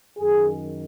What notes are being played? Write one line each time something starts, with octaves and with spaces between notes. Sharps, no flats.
F#2 D#3 G#4